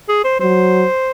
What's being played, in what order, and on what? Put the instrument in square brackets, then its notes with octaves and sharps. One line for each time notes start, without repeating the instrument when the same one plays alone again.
[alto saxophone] G#4
C5
[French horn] F#3 [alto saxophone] C5